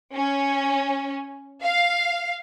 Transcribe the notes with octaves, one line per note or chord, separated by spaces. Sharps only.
C#4
F5